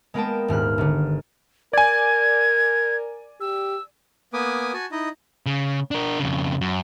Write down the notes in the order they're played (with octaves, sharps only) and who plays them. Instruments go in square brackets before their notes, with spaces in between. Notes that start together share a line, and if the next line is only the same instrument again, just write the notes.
[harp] G#3 A#3 B3 A#4 G5 A5
D#1 G#2 F6 F#6
G1 D3
[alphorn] A#4 [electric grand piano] D5 G#5 [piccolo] G#6
[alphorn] G4 [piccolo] E6
[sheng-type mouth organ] A#3 B3 B4 G#5 D6 D#6
F#4 G#5 A5
D#4 E4 D#5
[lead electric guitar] C#3
D4 A#4
F2 C#3
F#2